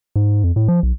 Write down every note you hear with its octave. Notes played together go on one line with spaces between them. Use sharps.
G#2
F2
A2
F3
B1